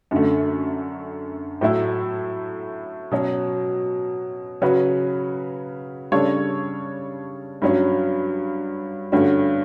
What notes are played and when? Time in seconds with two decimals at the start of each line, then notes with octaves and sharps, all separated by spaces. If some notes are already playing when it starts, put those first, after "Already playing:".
0.11 F#2 D3 A3
1.61 A2 F#3 A3 E4
3.11 B2 F#3 C#4
4.62 C#3 F#3 C#4 F#4 B4
6.12 C#3 G3 D4 A4 C#5
7.62 G2 F#3 C#4
9.12 G2 D3 A3 C#4 F#4